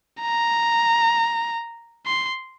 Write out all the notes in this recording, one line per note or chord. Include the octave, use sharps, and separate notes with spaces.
A#5
C6